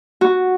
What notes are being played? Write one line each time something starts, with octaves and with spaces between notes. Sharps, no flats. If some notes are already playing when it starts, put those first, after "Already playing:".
F#4